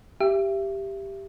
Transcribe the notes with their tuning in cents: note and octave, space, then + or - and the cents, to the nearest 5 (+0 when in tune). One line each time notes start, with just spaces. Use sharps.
G4 +0 E5 +30